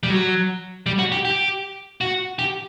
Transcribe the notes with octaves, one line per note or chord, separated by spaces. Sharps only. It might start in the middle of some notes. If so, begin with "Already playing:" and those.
G3
F#3
G3
F#4
G4
G4
F#4
G4